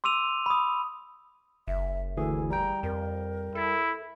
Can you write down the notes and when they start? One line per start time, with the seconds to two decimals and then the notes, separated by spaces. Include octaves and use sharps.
0.04 C6 D6 E6 D#7 F7
0.46 B5 D#6
1.68 F#1 E5
2.17 D2 E3 G#4 A4
2.50 G3 G5 A#5
2.83 F2 A#4
3.55 E4 A4